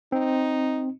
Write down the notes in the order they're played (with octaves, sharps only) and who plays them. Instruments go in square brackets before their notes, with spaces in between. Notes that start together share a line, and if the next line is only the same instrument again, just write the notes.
[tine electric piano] C4 [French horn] D#4